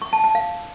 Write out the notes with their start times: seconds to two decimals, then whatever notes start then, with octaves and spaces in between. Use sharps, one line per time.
0.02 C#6
0.13 A5
0.24 A5
0.35 F5